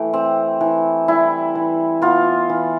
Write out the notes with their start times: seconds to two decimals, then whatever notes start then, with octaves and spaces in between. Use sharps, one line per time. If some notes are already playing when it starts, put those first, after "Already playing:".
Already playing: E3 A3 G4
0.13 C4
0.61 E3
1.08 G3 E4
1.55 E3
2.02 B3 F4
2.49 E3